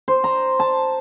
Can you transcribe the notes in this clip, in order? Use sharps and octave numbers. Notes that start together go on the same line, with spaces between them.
C5
A#5
A5